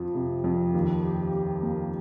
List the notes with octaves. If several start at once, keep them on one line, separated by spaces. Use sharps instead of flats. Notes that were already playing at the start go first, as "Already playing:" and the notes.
Already playing: F2 F3
C3
F2
D#2
G4
G4
A#3